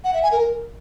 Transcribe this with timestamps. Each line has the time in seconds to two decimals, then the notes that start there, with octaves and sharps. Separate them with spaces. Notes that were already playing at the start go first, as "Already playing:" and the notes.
0.04 F#5
0.14 E5
0.23 G#5
0.32 A#4